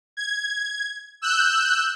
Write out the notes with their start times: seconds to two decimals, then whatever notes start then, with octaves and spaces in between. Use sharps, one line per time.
0.17 G#6
1.22 E6 F#6 G6